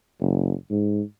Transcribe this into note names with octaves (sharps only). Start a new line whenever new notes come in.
F#1
G#2